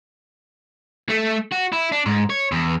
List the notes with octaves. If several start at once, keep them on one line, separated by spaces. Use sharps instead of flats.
A3
F#4
E4
D4
G#2
C#5
E2